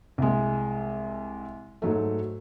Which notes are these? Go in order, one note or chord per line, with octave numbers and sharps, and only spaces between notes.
C2 G#3
G#2 F#3 A3